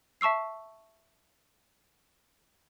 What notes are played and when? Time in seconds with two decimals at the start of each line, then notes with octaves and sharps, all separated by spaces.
0.21 E5 A5 C#6 E6 C7